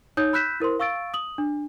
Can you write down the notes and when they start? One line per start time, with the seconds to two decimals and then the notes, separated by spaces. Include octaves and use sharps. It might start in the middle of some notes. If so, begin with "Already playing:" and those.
0.17 D#4 C#5 D#6 G6
0.33 B5 E6 F#6 G6 B6 E7
0.60 E4 A#4 C5 C6
0.79 F5 C#6 E6 A6 D7
1.14 D#6 F#7
1.38 D4